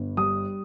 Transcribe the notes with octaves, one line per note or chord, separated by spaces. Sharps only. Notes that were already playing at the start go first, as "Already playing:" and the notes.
Already playing: G1
G3 D#6